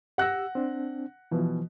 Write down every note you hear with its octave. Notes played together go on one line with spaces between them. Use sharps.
G4 F#5 E6 F#6 A#6
C4 D4
B2 E3 F3